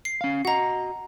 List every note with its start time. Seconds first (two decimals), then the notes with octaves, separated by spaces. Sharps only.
0.05 C7
0.21 C#4 F5
0.45 F#4 D#5 F#5 A#5